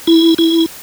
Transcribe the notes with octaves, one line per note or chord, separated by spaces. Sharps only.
E4
E4